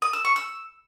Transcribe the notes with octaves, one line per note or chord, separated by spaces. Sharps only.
D#6
E6
C#6
E6